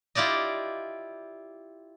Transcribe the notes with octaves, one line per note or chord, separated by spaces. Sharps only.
E4 F4 G4 D5 D#5